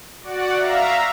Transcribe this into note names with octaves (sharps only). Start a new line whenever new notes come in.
F#4 D5 F#5
E5 F5 A#5